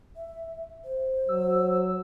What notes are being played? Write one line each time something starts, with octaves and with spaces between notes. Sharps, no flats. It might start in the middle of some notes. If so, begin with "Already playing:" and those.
E5
C5
F#3 E6